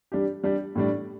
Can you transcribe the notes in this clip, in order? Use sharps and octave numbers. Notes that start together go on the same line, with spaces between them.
G3 D4 G4
G3 D4 G4
A2 G3 D4